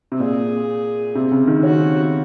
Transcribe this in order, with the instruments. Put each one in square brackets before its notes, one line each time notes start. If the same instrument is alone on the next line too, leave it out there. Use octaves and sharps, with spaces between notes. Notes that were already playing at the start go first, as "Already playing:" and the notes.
[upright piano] C3
[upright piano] A#2 [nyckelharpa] G#4
[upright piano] C3
C#3
D#3
[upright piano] C#4 [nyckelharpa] F#4